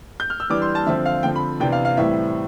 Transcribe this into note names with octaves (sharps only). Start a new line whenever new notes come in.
G6
F6
E6
E3 G3 D4 D6
C6
A5
D3 F3 C4 E5
F5
D3 F3 C4 G5
B5
C3 E3 B3 D4 G5
F5
F5
A2 E3 G3 C4 E5